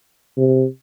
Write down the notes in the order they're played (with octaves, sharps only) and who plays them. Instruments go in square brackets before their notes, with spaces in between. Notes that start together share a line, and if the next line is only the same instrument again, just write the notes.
[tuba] C3